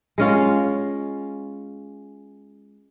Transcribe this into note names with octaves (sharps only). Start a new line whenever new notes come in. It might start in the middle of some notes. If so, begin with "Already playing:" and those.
G#3 C#4 F4